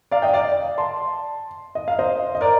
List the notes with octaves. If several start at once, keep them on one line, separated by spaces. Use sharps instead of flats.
D5 F5
D#5 G5
D5 F5
A5 C6
D#5
F5
C5 D#5
D#5
A#4 D5